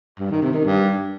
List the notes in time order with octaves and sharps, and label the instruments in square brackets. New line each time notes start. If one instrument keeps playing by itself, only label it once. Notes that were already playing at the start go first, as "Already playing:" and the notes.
[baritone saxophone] G2
D#3
C3
D#3
G2